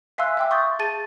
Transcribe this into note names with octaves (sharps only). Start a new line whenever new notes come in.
E5 F5 G#5 C6 E6 F#6
E5 F5 G5 D6 E6
C6 C#6 D#6 G6 A6
G#4 A5 A6 D#7